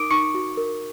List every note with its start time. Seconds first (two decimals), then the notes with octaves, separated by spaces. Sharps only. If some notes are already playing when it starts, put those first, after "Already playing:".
Already playing: D#4 A#4 D6 D#6 D7
0.11 D#4 C#6 C#7
0.34 F#4
0.57 A#4